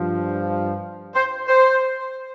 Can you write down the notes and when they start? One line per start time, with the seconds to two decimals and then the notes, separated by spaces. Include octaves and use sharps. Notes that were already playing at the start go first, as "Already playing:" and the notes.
Already playing: G2 F3
1.15 C5
1.48 C5